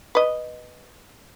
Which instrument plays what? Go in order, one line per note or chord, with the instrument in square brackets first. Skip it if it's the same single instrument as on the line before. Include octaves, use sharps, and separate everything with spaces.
[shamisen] B4 D#5